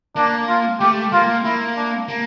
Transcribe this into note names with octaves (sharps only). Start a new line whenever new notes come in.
A#3 D4
F4
A3 G4
A#3 F4
A#3 E4
D4
A#3